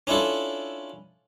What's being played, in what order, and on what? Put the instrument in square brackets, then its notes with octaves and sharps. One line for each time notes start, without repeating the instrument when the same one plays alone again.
[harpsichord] C#4 D4 E4 F4 A4